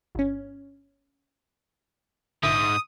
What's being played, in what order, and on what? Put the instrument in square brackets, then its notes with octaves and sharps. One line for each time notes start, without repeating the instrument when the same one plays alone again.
[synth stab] G1 C#4
[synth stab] A#1 D3 E5 [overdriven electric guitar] G#2 [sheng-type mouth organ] D#6